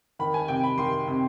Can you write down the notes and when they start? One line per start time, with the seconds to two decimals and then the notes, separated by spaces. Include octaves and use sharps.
0.19 D#3 B5
0.34 G#5
0.48 C3 G5
0.64 B5
0.78 D#3 C6
1.07 C3